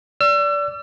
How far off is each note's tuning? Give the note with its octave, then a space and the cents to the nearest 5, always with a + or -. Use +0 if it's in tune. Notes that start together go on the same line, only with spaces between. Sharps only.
D5 -20 E6 +40